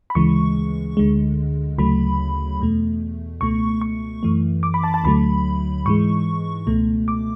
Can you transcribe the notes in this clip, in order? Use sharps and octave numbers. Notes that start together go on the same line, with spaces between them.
B5
D2 C#3 E3 G#3 C#6
D2 D3 G#3
D2 C#3 F#3 A3 B5
E2 B2 A3
C#2 B2 A3 C#6
C#6
F#2 E3 A3
D6
B5
A5
A5
D2 D3 F#3 A3 B5
G#2 E3 G#3 C#6
C#2 B2 A3
D6